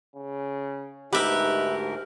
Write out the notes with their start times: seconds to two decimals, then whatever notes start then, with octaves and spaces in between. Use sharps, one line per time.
0.15 C#3
1.13 D2 G#2 D#4 G4 A#4 B4 E5